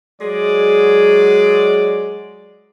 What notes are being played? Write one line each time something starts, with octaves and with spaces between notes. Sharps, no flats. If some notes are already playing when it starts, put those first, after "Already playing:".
F#3 G#3 G#4 D5